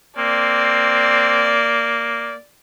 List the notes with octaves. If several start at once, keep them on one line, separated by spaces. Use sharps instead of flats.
A#3 C4 D5